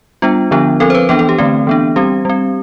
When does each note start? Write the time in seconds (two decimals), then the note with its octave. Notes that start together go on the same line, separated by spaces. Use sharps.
0.22 G3 B3 D4 F4
0.51 D3 F3 B3 D4
0.80 F3 C4 A4
0.90 C5
0.95 B4
1.09 E3 B3 D4 A4
1.19 A4
1.29 G4
1.38 D3 A3 C4
1.67 E3 B3 D4
1.96 G3 C4 G4
2.25 G3 C4